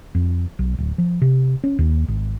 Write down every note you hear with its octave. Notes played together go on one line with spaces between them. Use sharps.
F2
B1
D1
F3
C3
C#4
D#2
G#1